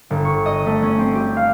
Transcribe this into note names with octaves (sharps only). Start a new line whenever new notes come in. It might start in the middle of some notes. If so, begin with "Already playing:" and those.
G1
C#6
D#5
A3
C#4
C4
G4
F5